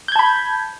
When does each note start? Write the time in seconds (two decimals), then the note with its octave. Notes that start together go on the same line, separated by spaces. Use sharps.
0.08 G6
0.12 G#6
0.16 A5
0.19 B5